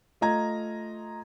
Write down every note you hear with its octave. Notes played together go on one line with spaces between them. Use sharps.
A3 F4 D#5 A#5 G#6